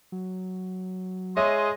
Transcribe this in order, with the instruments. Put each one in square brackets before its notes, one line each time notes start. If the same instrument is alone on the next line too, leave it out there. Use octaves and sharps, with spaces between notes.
[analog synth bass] F#3
[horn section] G#3 D#5 C6 [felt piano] C#5 E5